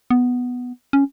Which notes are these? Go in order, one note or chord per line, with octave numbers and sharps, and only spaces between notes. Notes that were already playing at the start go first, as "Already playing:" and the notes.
B3
C#4